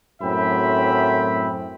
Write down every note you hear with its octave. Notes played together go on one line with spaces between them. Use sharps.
F#2 A2 C4 E5 G5 B5